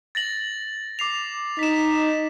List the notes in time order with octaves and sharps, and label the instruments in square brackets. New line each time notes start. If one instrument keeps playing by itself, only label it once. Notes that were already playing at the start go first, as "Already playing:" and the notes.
[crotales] A6 A#6 F#7
D6 C7 F7
[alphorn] D#4 [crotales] B6 E7